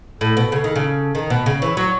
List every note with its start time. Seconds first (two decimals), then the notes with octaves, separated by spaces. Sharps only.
0.21 A2 A4
0.37 B2
0.52 C#3
0.64 D#3
0.76 C#3
1.15 D#3
1.30 B2
1.46 C#3
1.61 E3 C#5
1.77 F#3